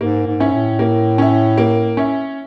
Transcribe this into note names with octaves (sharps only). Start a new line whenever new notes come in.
G#2 A#3
G#2
C#4 E4
A2
A#3
C#4 E4
A#3
C#4 E4